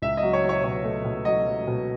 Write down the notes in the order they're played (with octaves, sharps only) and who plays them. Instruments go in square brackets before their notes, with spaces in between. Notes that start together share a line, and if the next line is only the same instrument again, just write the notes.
[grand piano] C#2 E5
D#5
F#3
C#5
F#3
C#5
B2 C#5
A3
B2
F#3 D#5
F#3
B2